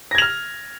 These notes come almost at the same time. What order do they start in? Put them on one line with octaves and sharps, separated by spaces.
A#6 G#6 F7 F6